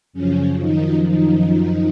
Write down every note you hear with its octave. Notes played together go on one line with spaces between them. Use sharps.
F#2 C#3 F3 C#4
D#3 D#4
D#3 D#4